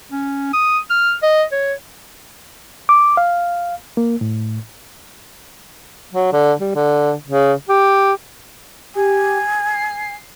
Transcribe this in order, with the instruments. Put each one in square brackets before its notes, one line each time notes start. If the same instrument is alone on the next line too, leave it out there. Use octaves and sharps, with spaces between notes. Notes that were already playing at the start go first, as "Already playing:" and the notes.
[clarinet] C#4
D#6
F6
D#5
C#5
[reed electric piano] D6
F5
A#3
A2
[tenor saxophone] F#3
D3
G3
D3
C#3
G4
[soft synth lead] G4 [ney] G#5
[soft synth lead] C7